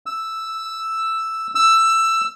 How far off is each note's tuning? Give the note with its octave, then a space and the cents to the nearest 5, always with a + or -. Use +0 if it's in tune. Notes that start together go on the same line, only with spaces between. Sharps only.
E6 +0
E6 +10